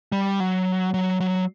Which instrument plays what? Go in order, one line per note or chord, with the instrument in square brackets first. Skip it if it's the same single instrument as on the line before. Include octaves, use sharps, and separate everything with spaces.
[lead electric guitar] G3
F#3
F#3
F#3